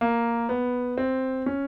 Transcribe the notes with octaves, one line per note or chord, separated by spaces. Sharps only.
A#3
B3
C4
C#4